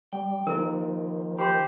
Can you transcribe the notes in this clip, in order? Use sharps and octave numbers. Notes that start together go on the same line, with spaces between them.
G3 G5
D#3 F3 A#3 D#4 E4 A#4
G4 C5 B5 C6